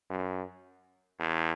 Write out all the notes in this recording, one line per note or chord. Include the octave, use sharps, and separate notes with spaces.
F#2
E2